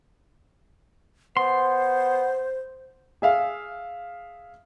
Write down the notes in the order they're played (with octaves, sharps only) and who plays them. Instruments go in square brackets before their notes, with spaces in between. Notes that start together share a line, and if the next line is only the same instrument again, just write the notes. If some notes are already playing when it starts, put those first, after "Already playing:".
[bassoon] B3 [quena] C5 [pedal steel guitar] C6
[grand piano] G#4 E5 F5